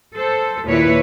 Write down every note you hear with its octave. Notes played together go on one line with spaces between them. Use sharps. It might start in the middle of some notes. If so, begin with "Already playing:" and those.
A4 C5
D#2 A#2 A#3 E4 B4 C#5